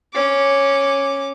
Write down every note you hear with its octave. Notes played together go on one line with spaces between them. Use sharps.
C#4 D6